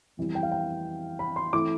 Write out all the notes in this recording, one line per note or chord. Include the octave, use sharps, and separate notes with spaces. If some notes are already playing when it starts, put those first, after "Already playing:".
F2 E3 G3 B3
G5
F5
G5
B5
C6
E3 A3 C4 E4 D6